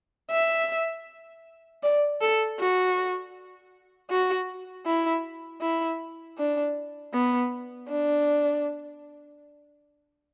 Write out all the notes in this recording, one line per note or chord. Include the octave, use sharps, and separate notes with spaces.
E5
D5
A4
F#4
F#4
E4
E4
D4
B3
D4